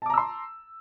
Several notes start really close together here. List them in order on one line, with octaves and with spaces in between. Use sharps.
A5 D6 A#5 E6 C6